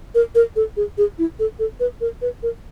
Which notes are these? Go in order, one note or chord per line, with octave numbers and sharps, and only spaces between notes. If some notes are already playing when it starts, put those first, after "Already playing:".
A#4
A#4
A4
G#4
G#4
E4
A4
A4
B4
A#4
B4
A#4